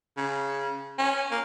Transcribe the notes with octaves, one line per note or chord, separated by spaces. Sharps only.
C#3
C#4
A#3